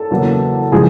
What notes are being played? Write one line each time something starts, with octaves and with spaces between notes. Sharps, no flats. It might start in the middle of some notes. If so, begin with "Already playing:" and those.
Already playing: A4 A5
E2 C#3 F#3 A#3
C#3 F3 G#3 G#4 G#5